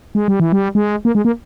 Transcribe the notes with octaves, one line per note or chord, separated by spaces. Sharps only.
G#3
G3
E3
G3
G#3
A#3
G#3
A#3